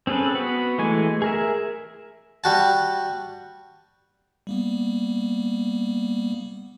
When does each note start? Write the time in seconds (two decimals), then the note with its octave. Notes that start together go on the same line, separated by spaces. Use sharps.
0.07 C4 C#4 G#4 A4 B4
0.35 B3 F#4
0.78 E3 G#3 A3 G#5
1.22 G#4 A#4 E5
2.44 G3 F#4 A5
4.47 G3 A#3 B3